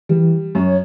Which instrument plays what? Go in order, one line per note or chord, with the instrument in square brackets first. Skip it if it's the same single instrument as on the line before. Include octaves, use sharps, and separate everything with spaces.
[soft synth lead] E3 [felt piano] G3
[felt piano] F#2 [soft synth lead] C#5